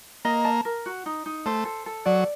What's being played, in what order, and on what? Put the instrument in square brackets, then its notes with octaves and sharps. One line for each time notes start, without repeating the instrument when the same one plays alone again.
[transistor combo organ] A#3 [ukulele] D#5
[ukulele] A5
A#4
F#4
D#4
D#4
[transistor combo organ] A3 [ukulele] C5
[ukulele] A4
A4
[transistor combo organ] F#3 [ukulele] D5